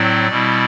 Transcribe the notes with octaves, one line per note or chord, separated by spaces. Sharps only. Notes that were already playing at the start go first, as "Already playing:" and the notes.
Already playing: A2 F#3 C4 E4 D5
B2 G3 C4 E4